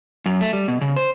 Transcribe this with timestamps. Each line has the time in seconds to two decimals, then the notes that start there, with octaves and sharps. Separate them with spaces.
0.26 F#2
0.41 A3
0.53 G3
0.68 B2
0.81 C#3
0.96 C5